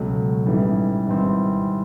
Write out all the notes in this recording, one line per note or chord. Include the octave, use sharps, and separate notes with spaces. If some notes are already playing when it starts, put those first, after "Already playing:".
Already playing: C#2 B2 F#3 A3
A1 G#2 E3 G3
G#1 G#2 E3 G3 C4